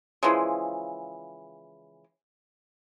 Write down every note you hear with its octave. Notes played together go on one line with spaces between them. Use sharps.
C#3 E3 F3 G#3